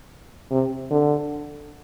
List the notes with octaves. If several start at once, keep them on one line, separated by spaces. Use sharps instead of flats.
C3
D3